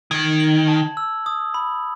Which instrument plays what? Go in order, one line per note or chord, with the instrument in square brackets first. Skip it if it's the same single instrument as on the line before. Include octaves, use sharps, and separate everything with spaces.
[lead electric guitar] D#3 [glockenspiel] G#6
[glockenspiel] F#7
A5
E6
D#6
B5